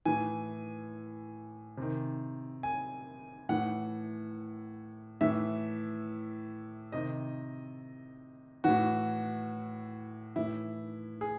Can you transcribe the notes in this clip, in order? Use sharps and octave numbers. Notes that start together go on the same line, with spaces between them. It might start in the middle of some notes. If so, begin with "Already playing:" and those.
A2 E3 G#5
C3 D#3
G#5
A2 E3 F#5
A2 E3 E5
C3 D#3 D#5
A2 E3 F#4
A2 E3 E4
G#4